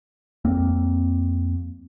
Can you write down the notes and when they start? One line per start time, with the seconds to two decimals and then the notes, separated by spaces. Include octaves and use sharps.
0.45 F2 A#3 C4